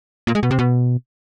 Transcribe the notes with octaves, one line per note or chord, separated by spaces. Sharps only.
A#2
G#3
B2
C3
B2